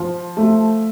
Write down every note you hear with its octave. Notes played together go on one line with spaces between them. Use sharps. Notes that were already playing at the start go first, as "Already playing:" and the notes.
Already playing: F3
A3